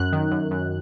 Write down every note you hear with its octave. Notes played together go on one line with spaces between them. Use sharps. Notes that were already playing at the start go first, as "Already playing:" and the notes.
Already playing: F#2 F#6
D#3
F#2
F#2